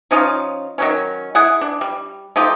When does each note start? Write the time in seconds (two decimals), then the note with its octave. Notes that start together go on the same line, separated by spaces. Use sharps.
0.11 F3 C#4 D#4 F5
0.78 D#3 F#3 C#4
1.35 E4 G#4 F#5
1.61 D4
1.81 G3
2.36 F3 A3 D#4 G4